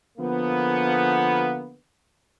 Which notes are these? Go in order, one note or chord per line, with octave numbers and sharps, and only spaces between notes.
D3 F3 A#3 B3